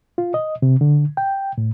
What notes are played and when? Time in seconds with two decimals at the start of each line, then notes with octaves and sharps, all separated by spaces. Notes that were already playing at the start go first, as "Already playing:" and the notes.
0.18 F4
0.34 D#5
0.62 C3
0.81 D3
1.17 G5
1.58 A2